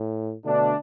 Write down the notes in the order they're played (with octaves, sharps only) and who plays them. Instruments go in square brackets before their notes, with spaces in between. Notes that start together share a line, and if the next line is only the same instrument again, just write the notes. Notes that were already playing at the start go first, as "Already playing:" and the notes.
Already playing: [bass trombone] A2
[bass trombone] B2 [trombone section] D3 A3 D4